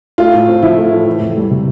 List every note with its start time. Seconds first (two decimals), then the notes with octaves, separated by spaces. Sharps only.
0.18 A3 F4
0.33 A2
0.48 C4
0.63 F3 E4
0.78 A3
0.92 A2
1.06 E3
1.21 F2
1.37 G3
1.51 C3